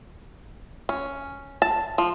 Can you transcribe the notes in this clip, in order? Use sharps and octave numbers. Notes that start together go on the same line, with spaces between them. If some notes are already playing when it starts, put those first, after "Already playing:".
C#4
A5
F3